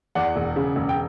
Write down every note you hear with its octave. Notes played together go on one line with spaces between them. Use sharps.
E2 D5 F#5
E1
C#3
E1
G5